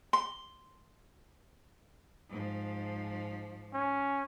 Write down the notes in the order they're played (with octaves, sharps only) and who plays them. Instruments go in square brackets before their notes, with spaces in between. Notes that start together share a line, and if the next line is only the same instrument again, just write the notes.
[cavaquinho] C6
[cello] G#2 F3
[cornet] C#4